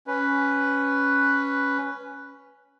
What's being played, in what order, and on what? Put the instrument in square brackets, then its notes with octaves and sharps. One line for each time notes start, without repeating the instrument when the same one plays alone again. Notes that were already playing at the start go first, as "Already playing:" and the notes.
[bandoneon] C#4 B4